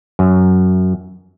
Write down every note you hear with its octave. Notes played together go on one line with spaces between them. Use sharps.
F#2